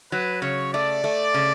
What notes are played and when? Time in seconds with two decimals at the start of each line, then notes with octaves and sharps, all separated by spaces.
0.12 F#3 B4
0.42 C#3 C#5
0.73 A3 D5
1.04 A3
1.34 C#3